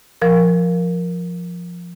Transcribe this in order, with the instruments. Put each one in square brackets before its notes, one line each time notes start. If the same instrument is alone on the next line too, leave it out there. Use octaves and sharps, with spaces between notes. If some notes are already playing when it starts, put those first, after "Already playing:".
[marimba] F3 A#4